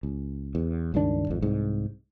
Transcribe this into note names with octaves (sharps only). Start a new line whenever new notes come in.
C#2
E2
C#2 G2 D#3 D4
G#1 F2
C2 G#2